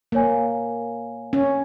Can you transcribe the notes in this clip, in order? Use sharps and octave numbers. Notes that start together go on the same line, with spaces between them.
A#3 A#4 C#5 G#5
C#4